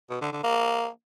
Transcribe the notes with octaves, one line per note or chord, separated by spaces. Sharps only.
B2
D3
D3
A#3